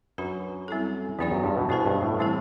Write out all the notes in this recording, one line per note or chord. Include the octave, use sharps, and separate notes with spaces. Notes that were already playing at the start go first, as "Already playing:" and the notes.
F#2 D4 F#4 B4
G3 C4 E4 A4
E2 F#3 B3 D4 G4 D5
F#2
G2
B2
B2 B3 E4 A4 C5
G2
A2
E3 G3 C4 E4 A4